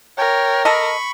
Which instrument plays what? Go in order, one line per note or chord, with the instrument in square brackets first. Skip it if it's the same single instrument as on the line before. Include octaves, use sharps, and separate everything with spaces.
[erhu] A#4 [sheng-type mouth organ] C#5 G5
[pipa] A4 D#5 [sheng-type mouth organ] B5 C#6